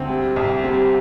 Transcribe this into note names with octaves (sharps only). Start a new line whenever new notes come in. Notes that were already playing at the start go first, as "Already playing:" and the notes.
Already playing: D2 C4
G3
C2
G3 C4